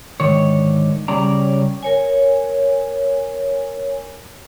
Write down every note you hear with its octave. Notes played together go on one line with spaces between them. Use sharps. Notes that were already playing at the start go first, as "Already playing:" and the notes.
G#2 D3 D#3 C#5
C#3 G3 C#4 D5 A#5
A#4 C#5 G#5